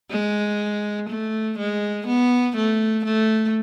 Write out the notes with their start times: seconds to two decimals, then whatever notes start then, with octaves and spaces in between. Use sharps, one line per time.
0.11 G#3
1.09 A3
1.58 G#3
2.07 B3
2.56 A3
3.05 A3